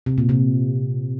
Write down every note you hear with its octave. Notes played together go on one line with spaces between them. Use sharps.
C3
A#2
C3